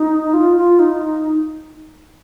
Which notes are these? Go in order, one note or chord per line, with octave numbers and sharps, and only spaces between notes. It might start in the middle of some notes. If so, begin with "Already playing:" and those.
Already playing: D#4
F4
F4
D#4